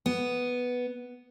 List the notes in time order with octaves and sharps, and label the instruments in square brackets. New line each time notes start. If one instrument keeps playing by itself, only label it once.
[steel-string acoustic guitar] B3